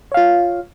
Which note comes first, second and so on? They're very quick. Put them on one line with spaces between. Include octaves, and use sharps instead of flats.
C#5 F5 F4